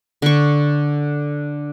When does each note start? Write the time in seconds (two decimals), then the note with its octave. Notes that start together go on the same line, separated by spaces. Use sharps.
0.22 D3 C#6